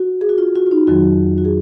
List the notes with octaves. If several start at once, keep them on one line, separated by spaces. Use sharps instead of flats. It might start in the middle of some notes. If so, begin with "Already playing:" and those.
Already playing: F#4
G#4
F#4
F4
F#4
F4
D#4
F2 D#3 F#3 F#4
F#4
G#4